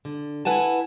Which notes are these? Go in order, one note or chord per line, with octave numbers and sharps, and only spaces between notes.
D3
E4 B4 F#5 G#5 A5